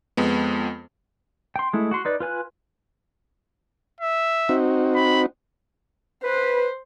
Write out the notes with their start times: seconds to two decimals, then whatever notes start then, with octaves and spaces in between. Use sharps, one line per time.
0.17 F2 G#3 B3
1.56 G5 C6
1.73 G#3 A3 E4
1.91 F#4 F#5 C6
2.05 D#4 B4 D5
2.20 F4 B4 G#5 F#6
4.01 E5
4.49 C4 D#4 F#4
4.95 B5
6.24 B4 C5